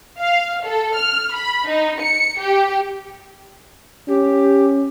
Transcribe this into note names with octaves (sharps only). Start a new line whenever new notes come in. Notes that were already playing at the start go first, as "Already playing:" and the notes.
F5
A4
F6
B5
D#4
C#7
G4
C#4 G4